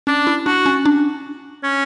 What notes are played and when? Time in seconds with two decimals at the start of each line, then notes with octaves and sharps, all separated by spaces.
0.07 C#4 D4
0.27 E4
0.46 D4 F#4
0.66 C#4
0.85 D4
1.64 C#4